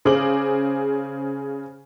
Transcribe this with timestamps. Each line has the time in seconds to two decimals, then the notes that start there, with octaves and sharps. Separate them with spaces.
0.05 C#3 G#4 C5 D6 F#7